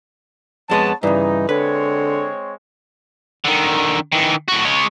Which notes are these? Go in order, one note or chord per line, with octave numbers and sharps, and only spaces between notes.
F2 G#3 B3 C#5 F#5 A5
G2 C#3 E3 D#4
D3 G#3 C4 B4 C#5
D3 D#3
D#3 E3
A2 F#4
G#3 C#5